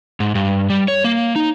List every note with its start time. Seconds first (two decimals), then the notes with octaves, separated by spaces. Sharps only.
0.20 G#2
0.35 G2
0.70 G3
0.88 C#5
1.04 A#3
1.36 D#4